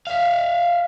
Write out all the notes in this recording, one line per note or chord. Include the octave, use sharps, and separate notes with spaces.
E5 F5